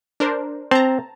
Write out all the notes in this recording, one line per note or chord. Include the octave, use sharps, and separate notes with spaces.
D4 A#4 C5
C4 A5 A#5